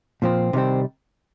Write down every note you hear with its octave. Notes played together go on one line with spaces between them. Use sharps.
A#2 F3 C4
C3 D#3 G3 C4